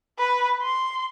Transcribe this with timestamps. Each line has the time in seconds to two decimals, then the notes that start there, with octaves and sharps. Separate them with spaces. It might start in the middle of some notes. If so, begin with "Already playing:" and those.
0.19 B4
0.62 C6